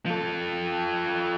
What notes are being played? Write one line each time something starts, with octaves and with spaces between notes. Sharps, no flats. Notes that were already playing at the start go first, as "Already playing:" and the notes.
F3 A4